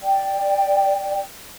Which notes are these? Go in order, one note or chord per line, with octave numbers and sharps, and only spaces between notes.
D5 G5